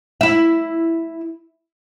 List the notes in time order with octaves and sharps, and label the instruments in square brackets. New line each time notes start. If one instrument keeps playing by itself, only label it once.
[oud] E4 E5